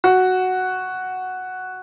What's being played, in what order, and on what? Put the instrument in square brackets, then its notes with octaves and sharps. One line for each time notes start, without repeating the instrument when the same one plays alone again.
[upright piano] F#4